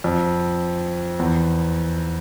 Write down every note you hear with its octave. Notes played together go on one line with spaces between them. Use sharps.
F2
E2